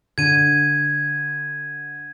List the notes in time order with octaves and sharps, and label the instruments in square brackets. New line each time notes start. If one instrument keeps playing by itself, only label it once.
[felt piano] D3 [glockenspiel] G#6 D#7